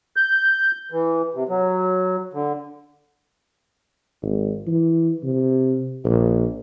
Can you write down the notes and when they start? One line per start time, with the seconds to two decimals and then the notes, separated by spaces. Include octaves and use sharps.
0.16 G6
0.92 E3
1.34 C3
1.49 F#3
2.33 D3
4.22 G#1
4.67 E3
5.23 C3
6.04 A#1